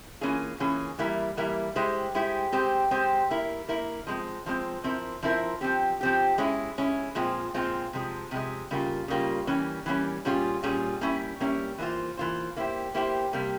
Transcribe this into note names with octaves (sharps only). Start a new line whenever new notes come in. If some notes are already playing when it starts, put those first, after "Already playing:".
E3 A#3 C#4 F4 G#4
E3 A#3 C#4 F4 G#4
E3 G3 A#3 E4 A#4
E3 G3 A#3 E4 A#4
G#3 E4 G4 C5
G#3 E4 G4 C5
G#3 C4 G4 C5
G#3 C4 G4 C5
A#3 E4 A#4
A#3 E4 A#4
F3 G#3 C4
F3 G#3 C4
F3 C4 E4 A#4
F3 C4 E4 A#4
F3 C4 G4
F3 C4 G4
G#3 C#4 E4
G#3 C#4 E4
A#2 F3 G#3 C4 F4
A#2 F3 G#3 C4 F4
C3 F3 G#3
C3 F3 G#3
C#3 G3 A#3 F4
C#3 G3 A#3 F4
E3 G3 A#3 C#4
E3 G3 A#3 C#4
A#2 G3 C#4 F4 G#4
A#2 G3 C#4 F4 G#4
G3 A#3 C#4 E4
G3 A#3 C#4 E4
E3 A#3 F4 C5
E3 A#3 F4 C5
A#3 E4 G4 C5
A#3 E4 G4 C5
C3 G3 A#3